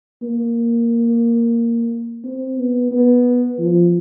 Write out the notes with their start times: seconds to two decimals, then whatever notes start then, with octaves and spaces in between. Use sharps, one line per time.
0.22 A#3
2.24 C4
2.58 B3
2.91 B3
3.59 F3